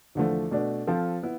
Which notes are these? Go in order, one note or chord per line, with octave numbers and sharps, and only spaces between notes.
E2 D3 F3 A3
B2 A3 D4
F3 C4 F4 A4
B3 E4